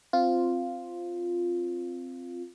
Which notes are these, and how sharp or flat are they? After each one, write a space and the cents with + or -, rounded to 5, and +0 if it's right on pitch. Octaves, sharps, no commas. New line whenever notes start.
C4 +0 F4 +0